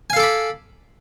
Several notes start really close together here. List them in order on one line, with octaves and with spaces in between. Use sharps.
G#5 F5 A4 D6 B5